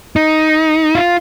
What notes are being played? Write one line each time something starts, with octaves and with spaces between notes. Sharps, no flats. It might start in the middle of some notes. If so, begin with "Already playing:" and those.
D#4
F4